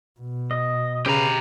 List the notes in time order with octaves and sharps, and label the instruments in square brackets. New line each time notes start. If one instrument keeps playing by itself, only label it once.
[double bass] B2
[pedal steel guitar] D#5
[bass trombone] C#3 [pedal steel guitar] C#4 B4 [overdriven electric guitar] G4 A#5